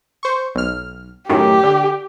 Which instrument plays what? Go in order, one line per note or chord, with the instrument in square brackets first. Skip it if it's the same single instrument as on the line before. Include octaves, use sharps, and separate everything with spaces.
[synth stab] C5 C#6
B1 F6
[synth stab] F#2 A2 D#3 [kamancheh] G4
[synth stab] D3